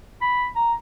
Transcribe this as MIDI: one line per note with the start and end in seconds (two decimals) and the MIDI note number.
0.21 0.47 83
0.55 0.73 82